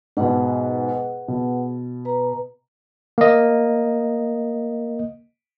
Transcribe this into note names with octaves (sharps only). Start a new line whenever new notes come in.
G#2 B2 G#4 B4 F#5
B2
B4 A#5
A#3 D#5